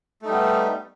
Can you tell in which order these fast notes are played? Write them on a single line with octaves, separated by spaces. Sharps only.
A3 D#4 G3 B3